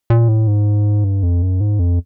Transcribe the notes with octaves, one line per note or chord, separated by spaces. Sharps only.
A#2
A2
G#2
G2
F2
F#2
G#2
F2